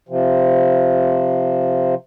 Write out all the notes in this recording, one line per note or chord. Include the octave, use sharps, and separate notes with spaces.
C3 F3